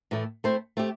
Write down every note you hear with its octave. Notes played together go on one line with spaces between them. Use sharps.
A2 E3 A3
A3 C4 E4 C5
A3 C4 G4